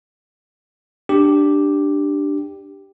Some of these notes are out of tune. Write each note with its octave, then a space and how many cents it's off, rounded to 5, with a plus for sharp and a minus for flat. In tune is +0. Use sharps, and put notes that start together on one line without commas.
D4 +5 G4 +0